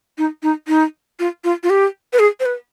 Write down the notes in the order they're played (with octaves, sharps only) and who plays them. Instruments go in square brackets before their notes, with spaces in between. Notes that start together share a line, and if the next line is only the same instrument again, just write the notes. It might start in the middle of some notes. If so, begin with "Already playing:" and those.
[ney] D#4
D#4
D#4
F4
F4
F4
G4
B4
G#4
C5
B4